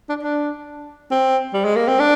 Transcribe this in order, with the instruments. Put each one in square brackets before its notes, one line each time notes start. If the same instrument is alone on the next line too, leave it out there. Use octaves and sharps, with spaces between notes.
[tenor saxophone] D4
D4
C4
G3
G#3
A#3
C4
D4